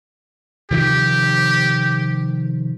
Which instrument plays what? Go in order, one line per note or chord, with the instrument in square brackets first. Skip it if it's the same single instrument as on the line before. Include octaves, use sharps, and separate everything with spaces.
[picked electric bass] C3 D#3 F3 [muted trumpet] G4